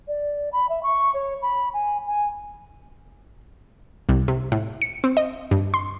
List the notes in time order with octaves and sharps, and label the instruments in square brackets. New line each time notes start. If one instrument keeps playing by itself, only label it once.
[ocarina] D5
B5
E5
C#6
C#5
B5
G#5
G#5
[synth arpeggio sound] C2
C3
A2
C#7
C4
D#5
G2
C6